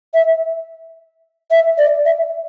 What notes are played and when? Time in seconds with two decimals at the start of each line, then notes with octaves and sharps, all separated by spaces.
0.14 E5
1.51 E5
1.78 D5
2.05 E5